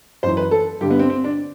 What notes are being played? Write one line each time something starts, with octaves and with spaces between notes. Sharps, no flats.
F#2 E3 C5
B4
A4
G2 D3 G4
B3
C4
C4
D4